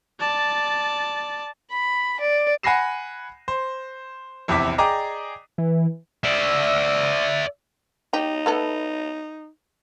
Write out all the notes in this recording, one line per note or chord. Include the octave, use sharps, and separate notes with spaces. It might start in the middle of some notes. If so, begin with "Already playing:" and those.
D5 A5
B5
D5
F#5 G#5 B5 A#6 C7 E7
C5
A#1 E2 C3 E4 D6 B6
G#4 D5 D#5 G5 A#5 D6
E3
D5 E5
D#4 G4
A3 B3 A4